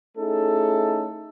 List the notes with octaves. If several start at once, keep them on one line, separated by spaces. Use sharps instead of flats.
A3 C#4 D#4 E4 G#4 A4